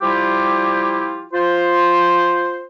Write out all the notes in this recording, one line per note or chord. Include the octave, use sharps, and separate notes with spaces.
F3 G3 E4 F4 G4
F4 C5